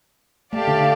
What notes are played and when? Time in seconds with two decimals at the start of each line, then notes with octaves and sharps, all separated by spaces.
0.53 A3 G4 D5 F5 A5
0.68 D3